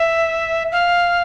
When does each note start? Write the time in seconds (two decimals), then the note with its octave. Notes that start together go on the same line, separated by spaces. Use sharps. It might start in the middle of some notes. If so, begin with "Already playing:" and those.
Already playing: E5
0.72 F5